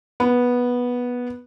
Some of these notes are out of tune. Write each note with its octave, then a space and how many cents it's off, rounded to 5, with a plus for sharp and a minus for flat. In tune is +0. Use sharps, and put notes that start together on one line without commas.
B3 -10